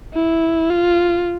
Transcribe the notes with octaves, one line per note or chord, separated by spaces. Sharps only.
E4
F4